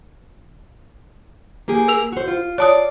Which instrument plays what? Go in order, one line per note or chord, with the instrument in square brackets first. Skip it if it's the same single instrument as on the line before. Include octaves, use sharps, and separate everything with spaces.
[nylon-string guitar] A#3 G4 G#4
[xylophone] A#4 E6 F7
[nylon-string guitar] F#4 C5
F4
[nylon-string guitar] F4 D5 [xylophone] C#5 A5 D#6